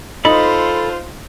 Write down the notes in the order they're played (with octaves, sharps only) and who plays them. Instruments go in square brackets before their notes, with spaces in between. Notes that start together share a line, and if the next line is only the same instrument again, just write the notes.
[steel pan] D#4 D#5 [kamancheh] F4 C5 [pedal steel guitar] A4 B5